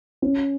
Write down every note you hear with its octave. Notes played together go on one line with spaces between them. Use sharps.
C#4